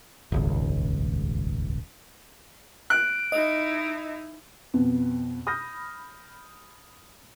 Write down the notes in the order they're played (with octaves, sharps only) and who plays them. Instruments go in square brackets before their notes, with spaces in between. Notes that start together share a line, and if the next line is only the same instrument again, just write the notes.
[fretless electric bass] D#1 G#1 C#2
[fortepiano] F#6 [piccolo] D7
[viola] D#4 E4 [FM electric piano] D#5
[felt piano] F2 B2 B3
B5 D#6 F6 G6 A#6